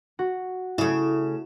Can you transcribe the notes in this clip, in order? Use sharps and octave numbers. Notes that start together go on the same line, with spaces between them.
F#4
C#3 A3 E4